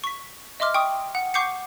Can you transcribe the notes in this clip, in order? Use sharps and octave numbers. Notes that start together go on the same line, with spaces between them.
C#6 B6
D#5 E5 C6 D6 F6
G5 C#6 D#6
F#5
F#5 C#6 D6 G6 C7 C#7